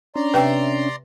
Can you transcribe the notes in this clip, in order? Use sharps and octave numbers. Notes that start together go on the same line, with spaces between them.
C#4 D4 D5 A#5 C6
C3 B4 E5 G5